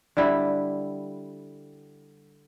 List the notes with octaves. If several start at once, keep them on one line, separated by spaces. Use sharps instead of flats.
D3 G3 E4